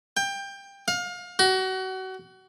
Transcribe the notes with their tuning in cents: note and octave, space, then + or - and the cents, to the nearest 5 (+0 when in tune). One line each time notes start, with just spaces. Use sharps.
G5 +20
F5 +30
F#4 +30